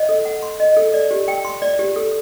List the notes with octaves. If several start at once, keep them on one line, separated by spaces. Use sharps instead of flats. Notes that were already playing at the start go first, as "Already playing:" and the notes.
Already playing: D#5
A4
F#5
C6
D#5
A4
D5
G4
G5
C6
D5
G4
A4